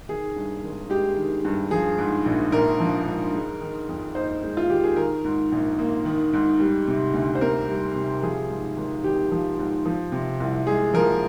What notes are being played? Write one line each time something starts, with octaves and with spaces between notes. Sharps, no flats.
D#3 G#4
G2
G#1
G#3 G4
D#3
G2
F3 G#4
G#2
A#1
A#1 A#4
F3
G#2
G#3
D#3
F2
D#4 C5
G#3
F4
D#3 G4
G#4
D#3 A#4
G#2
A#1
A#3
D#3
G#2
G3
C3
D2
C5
C4 A#4
G3
C3
F3 G#4
G#2
G#1
G#1 G4
F3
G#2
F3
C3
C2
G#3 G#4
F3 A#4